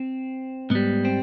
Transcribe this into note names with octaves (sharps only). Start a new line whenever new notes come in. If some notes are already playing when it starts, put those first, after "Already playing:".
Already playing: C4
G#2 G3 B3
C4